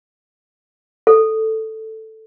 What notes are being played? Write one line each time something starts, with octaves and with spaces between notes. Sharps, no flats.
A4